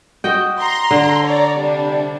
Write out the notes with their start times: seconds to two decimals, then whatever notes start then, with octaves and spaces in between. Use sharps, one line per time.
0.24 F#4 D#5 G5
0.60 A#5 C6
0.91 D3
1.25 C#5 D5 A#5
1.57 C3 G3 D4